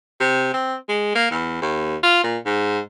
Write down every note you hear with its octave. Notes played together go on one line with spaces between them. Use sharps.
C3
C4
G#3
A#3
E2
D#2
F4
A#2
G#2